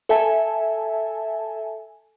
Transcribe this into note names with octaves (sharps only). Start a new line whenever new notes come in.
A4 E5 G#5 A5